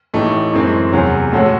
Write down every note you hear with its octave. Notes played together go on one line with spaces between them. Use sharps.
A1 A2 E3 A3 D#4
F#2 E3 G#3 C4
E2 C3 F#3 C#4
A2 G#3 C#4 F#4 A4